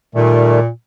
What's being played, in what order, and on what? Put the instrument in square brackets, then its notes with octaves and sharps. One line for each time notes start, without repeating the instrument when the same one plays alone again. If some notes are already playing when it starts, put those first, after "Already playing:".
[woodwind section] A#2 [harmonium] D#3 G3 A3